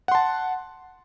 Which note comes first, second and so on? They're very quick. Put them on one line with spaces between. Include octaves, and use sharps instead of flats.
F#5 C6 A5